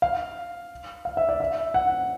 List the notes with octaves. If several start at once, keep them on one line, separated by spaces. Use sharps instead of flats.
F5
F5
E5
D5
E5
F#5